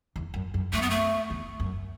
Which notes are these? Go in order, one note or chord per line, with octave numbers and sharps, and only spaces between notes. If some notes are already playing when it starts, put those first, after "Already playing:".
E2
F#2
F#2
F#2 A3
B3
A3
E2
F#2